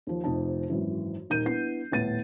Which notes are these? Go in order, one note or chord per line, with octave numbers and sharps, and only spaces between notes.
D#2 F3
F1 F2 C3 D#4 A5
G#1 F#2 E3
D#1 D#3 A#4 G6 D#7
B3 D4 E4 C7
D#1 A2 B3 A6 D#7